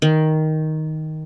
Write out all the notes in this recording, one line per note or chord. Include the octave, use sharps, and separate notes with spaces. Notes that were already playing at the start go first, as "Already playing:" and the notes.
D#3